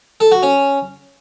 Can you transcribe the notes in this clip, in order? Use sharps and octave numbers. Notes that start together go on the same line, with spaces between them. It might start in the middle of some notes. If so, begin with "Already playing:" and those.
A4
F#4
C#4